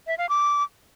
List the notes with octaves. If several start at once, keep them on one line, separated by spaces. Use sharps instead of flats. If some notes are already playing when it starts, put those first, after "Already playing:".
E5
F5
D6